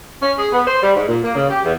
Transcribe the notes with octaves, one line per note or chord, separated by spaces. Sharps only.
C#4
G#4
B3
C5
G3
G#2
A#2
A#3
C#3
G4
E2